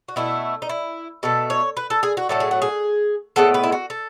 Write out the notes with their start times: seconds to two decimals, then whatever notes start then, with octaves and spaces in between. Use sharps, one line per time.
0.08 F#4
0.16 B2 A3 E4
0.62 D#4
0.69 E4
1.23 B2 A3 A4
1.50 C#5
1.77 B4
1.90 A4
2.03 G#4
2.17 F#4
2.29 A2 F#3 A3 A4
2.40 G#4
2.51 F#4
2.62 G#4
3.36 A2 G#3 B3 A4
3.54 B4
3.64 E4
3.72 F#4
3.90 A4